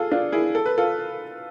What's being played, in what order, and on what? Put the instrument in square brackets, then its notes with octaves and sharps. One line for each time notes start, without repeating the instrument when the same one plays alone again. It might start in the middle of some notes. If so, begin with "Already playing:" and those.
Already playing: [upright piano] F4 G#4 A4
D4 F4
E4 G#4
A4
B4
F4 A4